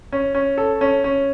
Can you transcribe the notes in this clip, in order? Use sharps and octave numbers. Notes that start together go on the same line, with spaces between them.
C#4
C#4
A4
C#4
C#4